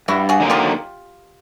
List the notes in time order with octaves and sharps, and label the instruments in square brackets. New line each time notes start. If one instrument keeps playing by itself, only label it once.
[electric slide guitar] G2 [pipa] E4 F#4
[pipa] F#4 G#4
[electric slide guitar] D3 F#3 A#3 D#4
[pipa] F4 G4